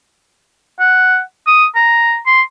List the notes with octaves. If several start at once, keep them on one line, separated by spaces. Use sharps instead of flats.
F#5
D#6
A#5
C6